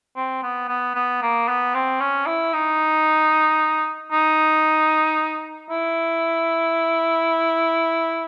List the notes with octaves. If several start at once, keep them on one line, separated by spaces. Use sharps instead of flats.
C4
B3
B3
B3
A#3
B3
C4
C#4
E4
D#4
D#4
E4